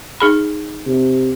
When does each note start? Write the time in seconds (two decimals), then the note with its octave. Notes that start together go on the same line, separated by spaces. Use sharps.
0.20 D#4 G#4 B5
0.86 C3